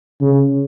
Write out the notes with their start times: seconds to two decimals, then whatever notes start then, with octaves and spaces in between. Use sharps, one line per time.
0.21 C#3